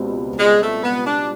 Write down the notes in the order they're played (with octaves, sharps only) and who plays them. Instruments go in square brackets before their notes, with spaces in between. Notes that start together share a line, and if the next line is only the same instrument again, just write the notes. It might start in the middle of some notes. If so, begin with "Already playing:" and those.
Already playing: [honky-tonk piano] C#2 B2 G3 C4
[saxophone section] G#3
A3
B3
D4